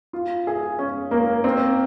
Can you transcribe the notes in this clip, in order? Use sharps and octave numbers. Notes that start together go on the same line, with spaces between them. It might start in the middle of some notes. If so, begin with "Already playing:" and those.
F4
G#4
C#4
A#3
C4